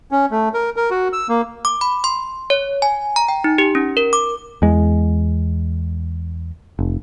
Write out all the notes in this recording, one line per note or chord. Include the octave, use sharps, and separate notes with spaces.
C#4
A3
A#4
A#4
F#4
E6
A#3
D6
B5
C6
C#5
G#5
A#5
G5
D#4
G4
C#4
A#4
D6
E2 G#3
F1